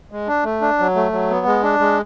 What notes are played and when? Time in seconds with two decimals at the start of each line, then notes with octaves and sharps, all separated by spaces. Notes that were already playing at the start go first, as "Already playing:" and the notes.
0.11 G#3
0.28 D4
0.44 A3
0.61 D4
0.79 F#3
0.95 A3
1.12 F#3
1.30 B3
1.46 G#3
1.63 D4
1.79 G#3